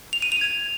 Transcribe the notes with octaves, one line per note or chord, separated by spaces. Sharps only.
F7
D#7
F7
G#6